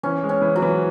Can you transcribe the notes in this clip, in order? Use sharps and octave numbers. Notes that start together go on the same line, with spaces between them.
E3 C#4
G#3
C#4
E3
F#3
E3